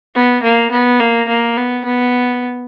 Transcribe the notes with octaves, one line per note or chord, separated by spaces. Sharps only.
B3
A#3
B3
A#3
A#3
B3
B3